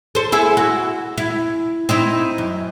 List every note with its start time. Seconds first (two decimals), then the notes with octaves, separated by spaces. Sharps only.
0.15 A4 C5
0.32 E4 G#4 E5
0.57 F#4
1.18 E4
1.89 C4 D#4 E4
2.38 F#2